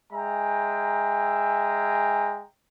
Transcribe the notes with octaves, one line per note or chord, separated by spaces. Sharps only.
G#3 E5 G5 G#5 A#5